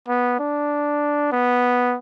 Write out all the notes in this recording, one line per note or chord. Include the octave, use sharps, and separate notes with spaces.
B3
D4
B3